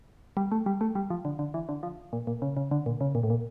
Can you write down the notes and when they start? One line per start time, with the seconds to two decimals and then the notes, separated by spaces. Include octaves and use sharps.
0.37 G3
0.52 A3
0.66 G3
0.81 A3
0.95 G3
1.10 F3
1.25 D3
1.39 D3
1.54 E3
1.69 D3
1.83 F3
2.13 A#2
2.27 A#2
2.42 C#3
2.57 C#3
2.71 D3
2.86 A#2
3.01 C#3
3.15 A#2
3.23 A2
3.30 A#2